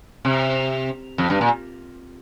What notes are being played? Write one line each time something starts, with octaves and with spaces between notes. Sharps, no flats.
C3
F2
G2
A#2